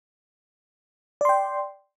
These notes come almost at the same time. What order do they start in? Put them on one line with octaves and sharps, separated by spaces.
D5 C6 G5